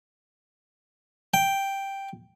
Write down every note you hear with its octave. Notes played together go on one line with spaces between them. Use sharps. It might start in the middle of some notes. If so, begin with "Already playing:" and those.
G5